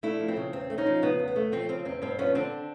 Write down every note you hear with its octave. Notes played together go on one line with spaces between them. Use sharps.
A3 D4 E4
F3
C4
C#3
E2 C4
A3
C#4 D#4
F3
C#3 B3
E2
B3
A3
F3 C4
C#3 C4
E2 C4
G2 C4
F3 B3 C#4
D3 C4 D4